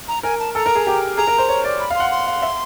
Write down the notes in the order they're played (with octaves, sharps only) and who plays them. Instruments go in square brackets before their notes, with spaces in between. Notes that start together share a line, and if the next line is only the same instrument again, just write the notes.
[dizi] A#5
[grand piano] A#4 [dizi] G#5
[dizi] A5
[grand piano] A4 [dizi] A#5
[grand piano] A#4
G#4
G4
[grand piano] G#4 [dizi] A#5
[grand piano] A#4
C5
C#5
D5
[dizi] B5
[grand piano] F5
[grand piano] F#5 [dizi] C6
[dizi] C6
[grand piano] F5
E5